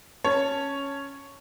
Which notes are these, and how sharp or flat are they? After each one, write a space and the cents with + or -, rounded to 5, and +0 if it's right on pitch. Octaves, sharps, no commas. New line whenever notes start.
C#4 +0 C#5 +0 A5 +0